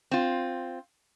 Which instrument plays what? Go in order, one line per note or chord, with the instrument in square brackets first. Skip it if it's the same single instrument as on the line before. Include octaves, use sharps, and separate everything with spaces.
[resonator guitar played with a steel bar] C4 F4